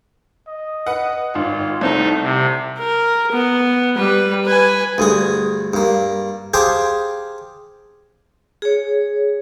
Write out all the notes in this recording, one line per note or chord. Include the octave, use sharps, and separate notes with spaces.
D#5
B4 F#5
G#1 F4
C2 A3 C4 D#4 A5
C3
A#4
B3
G3 B4
B4 G#5
D2 G2 G#4
G2 A#3
G4 G#4 C5 F5 G5 A5
G#4 C#5